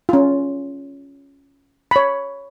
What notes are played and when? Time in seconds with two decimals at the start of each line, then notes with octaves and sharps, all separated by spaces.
0.09 C#4 F4
1.91 C#5 B5